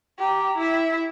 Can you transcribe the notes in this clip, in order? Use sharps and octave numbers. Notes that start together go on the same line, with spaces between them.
G4 A#5
E4 E5